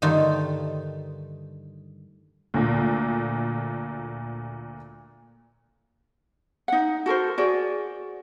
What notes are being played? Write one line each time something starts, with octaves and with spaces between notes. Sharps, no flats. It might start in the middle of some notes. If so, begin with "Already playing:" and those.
G2 D3 D#3 A3 D#4 F4
D2 A#2
D#4 F#5
F#4 A4 A#4 C5
F#4 G#4 D5